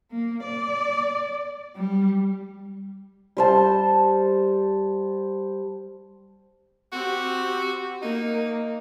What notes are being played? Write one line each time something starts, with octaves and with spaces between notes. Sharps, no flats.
A#3
D5
G3
G3 C5 A5
C4 F#4 G4
A#3 D#4